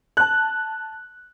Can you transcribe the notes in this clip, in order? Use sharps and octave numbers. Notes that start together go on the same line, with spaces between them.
A5 F#6